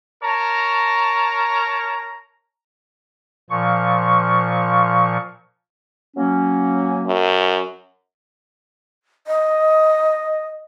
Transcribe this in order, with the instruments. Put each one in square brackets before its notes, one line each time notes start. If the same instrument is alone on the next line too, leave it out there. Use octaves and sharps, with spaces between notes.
[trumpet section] A#4 C#5 A5 A#5
[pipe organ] A#2 F3 C#6
[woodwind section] F#3 A#3 C#4
[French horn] F#2
[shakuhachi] D#5